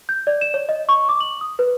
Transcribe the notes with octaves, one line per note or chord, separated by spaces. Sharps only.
G6
D5
E7
C#5
D#5
C#6
D6
F#7
D#6
B4